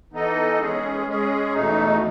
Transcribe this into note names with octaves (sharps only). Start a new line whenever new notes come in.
E3 B3 D#4 A4 D#5
G#3 C#4 G#4
G#3 C#4 G#4
E2 B2 A3 D#4